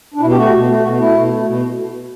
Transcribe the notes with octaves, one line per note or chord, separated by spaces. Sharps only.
D4
B2 E4
G4
A3 F#4
B2
A3
B2 F#4
A3 E4
B2
A3
B2